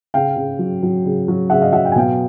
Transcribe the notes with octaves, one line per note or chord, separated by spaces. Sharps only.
C#3 F5 G5
C#3
F#3
F#3
C#3
F#3
C#3 E5 F#5
D#5 F5
F#3 E5 F#5
G5
G#5
B2 F5 G5